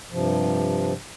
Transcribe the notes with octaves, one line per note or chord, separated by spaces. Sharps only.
G2 C3 F3